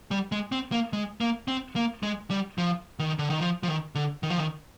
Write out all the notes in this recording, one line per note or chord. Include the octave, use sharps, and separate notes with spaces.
G3
G#3
C4
A#3
G#3
A#3
C4
A#3
G#3
G3
F3
D#3
D3
D#3
F3
F3
D#3
D3
D#3
F3
D#3